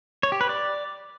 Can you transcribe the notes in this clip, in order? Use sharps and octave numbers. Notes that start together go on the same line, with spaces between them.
C#5
G4
B4
D5